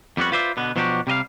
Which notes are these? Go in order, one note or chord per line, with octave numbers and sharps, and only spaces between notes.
F2 G3 B3 F#4
F4 B4 C5 D5 E5
B2 D3 B3
B2 F3 F#3 D4 F#4 G4
C3 G3 D#5 F5